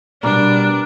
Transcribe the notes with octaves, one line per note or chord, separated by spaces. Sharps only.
B2 G3 D4 A#4 D5